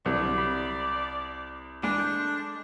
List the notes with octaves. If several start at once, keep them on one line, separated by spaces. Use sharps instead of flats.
C2 D3 F#3 D5
B5
E3 G#3 A#3 D4
G#3 A4 G6